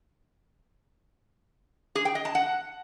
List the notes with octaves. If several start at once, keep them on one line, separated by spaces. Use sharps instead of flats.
G#4
G5
D#5
A5
F#5